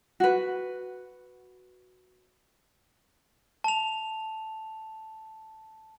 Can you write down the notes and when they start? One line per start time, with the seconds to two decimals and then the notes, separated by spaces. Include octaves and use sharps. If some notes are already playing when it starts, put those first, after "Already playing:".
0.20 F#4 B4
3.64 A5 F7